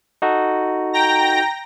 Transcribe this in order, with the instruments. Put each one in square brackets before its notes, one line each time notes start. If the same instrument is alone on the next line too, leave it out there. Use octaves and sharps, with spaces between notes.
[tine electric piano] D#4 F#4 A4
[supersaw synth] G5 A#5 A#6